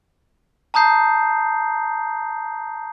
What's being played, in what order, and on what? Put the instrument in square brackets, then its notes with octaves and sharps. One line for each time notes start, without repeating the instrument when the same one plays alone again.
[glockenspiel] A5 A#5 D#6 G6 C7